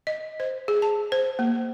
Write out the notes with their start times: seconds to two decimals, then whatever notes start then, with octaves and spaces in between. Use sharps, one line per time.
0.07 D#5
0.40 C5
0.68 G#4
0.82 A5
1.12 C5
1.39 A#3